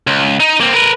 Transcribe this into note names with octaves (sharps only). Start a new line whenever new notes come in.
C#2
D#4
A#3 C4
A#4 B4